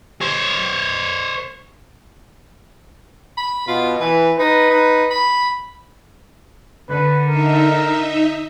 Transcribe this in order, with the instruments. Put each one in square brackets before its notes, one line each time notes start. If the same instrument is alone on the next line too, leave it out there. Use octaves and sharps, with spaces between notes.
[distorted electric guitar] C5 C#5
[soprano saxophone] B5
[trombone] B2 [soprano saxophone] F4
[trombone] E3 [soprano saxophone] B4
[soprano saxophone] D#4 [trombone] B4
[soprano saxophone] D#4
B5
[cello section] D3 [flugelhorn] B4
[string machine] D#4 E5 [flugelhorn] A#4